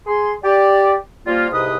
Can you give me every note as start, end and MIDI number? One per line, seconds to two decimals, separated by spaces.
0.06 0.33 68
0.06 0.33 84
0.43 0.95 67
0.43 0.95 74
1.26 1.48 53
1.26 1.48 55
1.26 1.48 58
1.26 1.48 65
1.52 1.77 36
1.52 1.77 44
1.52 1.77 48
1.52 1.77 71
1.52 1.77 75
1.52 1.77 87